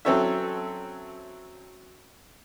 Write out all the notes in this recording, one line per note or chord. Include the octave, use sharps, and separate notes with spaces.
F#3 C4 C#4 A4 C#5 E5